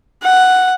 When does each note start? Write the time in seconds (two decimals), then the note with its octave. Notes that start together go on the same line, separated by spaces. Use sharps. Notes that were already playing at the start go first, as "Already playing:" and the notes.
0.23 F#5